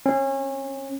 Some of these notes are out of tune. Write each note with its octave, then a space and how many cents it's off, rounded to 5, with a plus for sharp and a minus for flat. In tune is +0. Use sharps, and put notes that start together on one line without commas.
C#4 -30